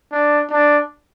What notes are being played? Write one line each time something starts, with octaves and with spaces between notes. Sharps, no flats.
D4
D4